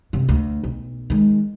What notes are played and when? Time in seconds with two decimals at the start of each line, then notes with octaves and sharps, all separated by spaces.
0.13 F#2 C3
0.29 D2
0.64 B1
1.10 D#3 G#3